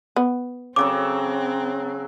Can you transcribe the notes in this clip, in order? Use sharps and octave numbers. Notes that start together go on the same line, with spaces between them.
B3
C#3 F#3 C4 A4 D6